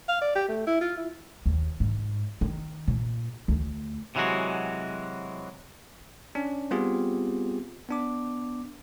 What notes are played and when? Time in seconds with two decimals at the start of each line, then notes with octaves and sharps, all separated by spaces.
0.09 F5
0.21 D5
0.35 G4
0.48 A3
0.67 E4
0.81 F4
0.97 E4
1.46 D#2
1.80 G#2
2.41 D#3
2.88 A#2
3.48 D2
4.15 C3 E3 F#3 G#3 F#4
6.35 C#4 D4
6.71 G3 B3 C4 F4 G4 G#4
7.89 B3 D4 D6